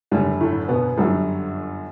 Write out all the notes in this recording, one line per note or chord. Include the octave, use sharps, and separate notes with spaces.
F#1 F#2 D3 G3
A2 A3
B2 B3
G1 F#2 D3 F#3 G3